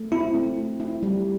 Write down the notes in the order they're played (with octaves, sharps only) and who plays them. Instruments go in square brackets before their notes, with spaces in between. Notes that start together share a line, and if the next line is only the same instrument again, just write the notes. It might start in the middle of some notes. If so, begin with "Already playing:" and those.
Already playing: [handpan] A3
[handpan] C4 [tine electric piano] E4
[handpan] A3
F4
E4
G3